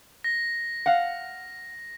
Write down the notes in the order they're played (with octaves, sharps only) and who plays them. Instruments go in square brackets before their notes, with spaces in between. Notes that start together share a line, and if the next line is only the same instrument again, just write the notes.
[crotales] A#6
[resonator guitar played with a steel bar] F5 F#5